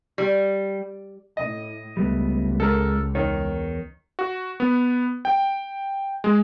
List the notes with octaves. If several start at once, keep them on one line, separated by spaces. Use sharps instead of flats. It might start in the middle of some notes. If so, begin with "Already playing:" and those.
G3
A2 D#5
C#2 G3 A3 B3
G#3 A4 A#4
E2 D#3 A#4 C#5
F#4
B3
G5
G#3